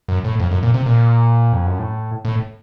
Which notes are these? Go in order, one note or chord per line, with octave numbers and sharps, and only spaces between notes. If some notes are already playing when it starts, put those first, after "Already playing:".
F#2
A2
F2
F#2
A#2
C3
A#2
F2
F#2
A2
A2